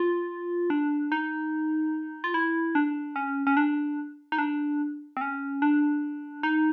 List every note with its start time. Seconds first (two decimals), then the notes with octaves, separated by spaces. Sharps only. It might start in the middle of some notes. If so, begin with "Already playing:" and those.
Already playing: F4
0.70 D4
1.12 D#4
2.24 F4
2.34 E4
2.75 D4
3.16 C#4
3.47 C#4
3.57 D4
4.32 D#4
4.38 D4
5.17 C4
5.21 C#4
5.62 D4
6.43 D#4